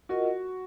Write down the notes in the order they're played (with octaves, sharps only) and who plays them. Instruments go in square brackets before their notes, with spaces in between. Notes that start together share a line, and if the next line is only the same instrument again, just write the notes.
[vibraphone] F4 A#4 D#5 F#5 [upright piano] F#4